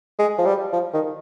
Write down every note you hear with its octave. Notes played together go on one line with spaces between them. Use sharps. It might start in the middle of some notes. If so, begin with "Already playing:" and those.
G#3
F3
G3
F3
D#3